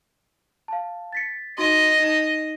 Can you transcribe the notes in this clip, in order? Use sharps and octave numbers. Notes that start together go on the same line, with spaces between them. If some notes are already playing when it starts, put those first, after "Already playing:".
F5 A5
A6 B6 C#7
D#4 F#4 D#5 C6
D#4 E7